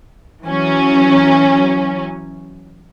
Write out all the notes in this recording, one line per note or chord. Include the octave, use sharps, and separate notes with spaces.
E3 F#3 C#4